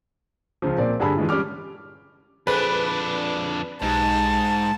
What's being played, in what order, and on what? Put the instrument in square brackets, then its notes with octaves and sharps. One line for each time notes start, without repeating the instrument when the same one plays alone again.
[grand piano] C#2 C#3 F3
A#2 C4 D5
G2 D3 G#4 A5 B5
E3 G#3 F4
G3 C#4 D6 F6
[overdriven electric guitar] F2 D4 [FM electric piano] G#4 A4 C5 [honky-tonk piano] B4
[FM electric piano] B1 D#4 G4 [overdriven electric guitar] G#2 [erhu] A5